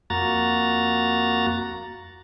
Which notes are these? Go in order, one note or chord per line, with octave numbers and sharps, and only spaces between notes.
F2 A#3 F#4 A#5 A6